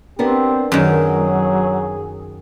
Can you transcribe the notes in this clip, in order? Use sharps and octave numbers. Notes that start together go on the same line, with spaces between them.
B3 C4 D4 G4 A#4
F#2 D#3 F#3 G#4